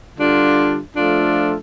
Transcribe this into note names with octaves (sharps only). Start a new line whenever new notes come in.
D3 G3 D4 F4
F3 A3 D4 F4 A4